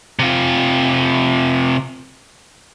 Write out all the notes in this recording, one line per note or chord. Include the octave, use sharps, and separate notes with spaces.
C3 F4